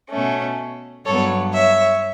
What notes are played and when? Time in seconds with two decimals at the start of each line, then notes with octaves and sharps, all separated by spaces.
0.10 B2 A3 C#4
1.06 G2 F#3 B3 A4 C#5
1.54 C#5 E5